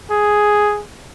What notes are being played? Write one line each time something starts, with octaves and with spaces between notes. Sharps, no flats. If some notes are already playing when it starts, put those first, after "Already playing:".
G#4